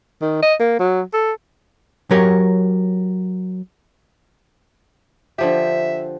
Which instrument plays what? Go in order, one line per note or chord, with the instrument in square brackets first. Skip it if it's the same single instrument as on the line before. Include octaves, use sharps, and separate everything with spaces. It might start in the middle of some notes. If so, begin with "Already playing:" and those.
[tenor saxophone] D#3
D#5
A#3
F#3
A4
[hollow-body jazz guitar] F#3 G4 A#4 C#5
[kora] D3 F3 G4 [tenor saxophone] E5